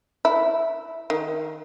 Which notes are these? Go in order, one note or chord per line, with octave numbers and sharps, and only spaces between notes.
E4
D#3